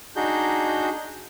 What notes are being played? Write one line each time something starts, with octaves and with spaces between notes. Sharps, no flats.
D4 D#4 F#4 G#4 G6